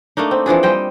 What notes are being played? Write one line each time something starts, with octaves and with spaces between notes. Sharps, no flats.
A3 A#3 D4 D#4
C4
E3 F3 D4 G#4
G3 C5 D#5 G5